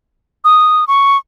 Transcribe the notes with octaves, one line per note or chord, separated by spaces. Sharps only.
D#6
C#6